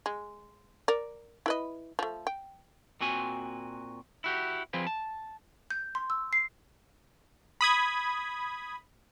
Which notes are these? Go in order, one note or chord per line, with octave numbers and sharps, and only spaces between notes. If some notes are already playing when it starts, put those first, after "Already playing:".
G#3
A#4 D5
E4 B4 D#5
F3 A3
G5
A#2 C4 F#4 G#5
E4 F#4 G4
F3 C4 G#4 B4
A5
G6
C6
E6
C7
B5 D#6 G#6